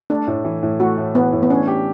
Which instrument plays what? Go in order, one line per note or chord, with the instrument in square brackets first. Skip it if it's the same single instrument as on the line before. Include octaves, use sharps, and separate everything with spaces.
[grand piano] A3 [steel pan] D4
[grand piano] A2
E3
A2
[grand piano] A3 [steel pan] F#4
[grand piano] A2
[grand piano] E3 [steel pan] B3
[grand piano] A2
[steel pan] B3
[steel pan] C#4 [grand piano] D4
[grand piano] G4